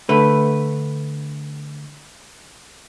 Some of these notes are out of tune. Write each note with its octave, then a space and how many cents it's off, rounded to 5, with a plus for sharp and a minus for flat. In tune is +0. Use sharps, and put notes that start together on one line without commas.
D3 +0 A3 +0 B4 +0